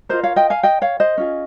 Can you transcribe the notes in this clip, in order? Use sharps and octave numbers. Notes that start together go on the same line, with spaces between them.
F4 A#4 C5 D#5
C#5 F5
D#5 G5
F5 G#5
D#5 G5
C#5 F5
C5 D#5
C#4 F4 G#4